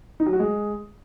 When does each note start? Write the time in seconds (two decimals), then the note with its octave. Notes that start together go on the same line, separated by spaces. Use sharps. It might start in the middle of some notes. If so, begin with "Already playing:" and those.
0.20 D#4
0.26 F#3
0.33 F#4
0.40 G#3